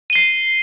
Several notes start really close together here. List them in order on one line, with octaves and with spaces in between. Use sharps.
D#7 G7 C7